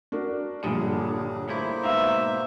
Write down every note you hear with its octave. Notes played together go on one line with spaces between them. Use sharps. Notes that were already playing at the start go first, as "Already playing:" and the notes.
D4 F#4 A#4
A#1 G2 D3 F#3 G3 G#4
A2 A#3 E4 C5
G#2 B2 B4 E5 F5 A#5